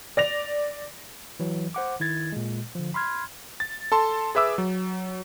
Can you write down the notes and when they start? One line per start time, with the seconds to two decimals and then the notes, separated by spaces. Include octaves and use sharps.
0.17 D5 A#6 F7
1.40 E3 F#3
1.74 C5 F#5 D6
2.00 D#3 E4 G#6 A6
2.32 A#2 G#3
2.75 D3 F3
2.94 B5 C6 F6 G#6
3.60 A6
3.92 A4 A5 C6
4.35 G#4 B4 E5 D6 E6
4.58 F#3